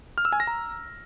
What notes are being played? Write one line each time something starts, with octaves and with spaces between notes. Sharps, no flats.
F6
E6
G#5
A#6
A#5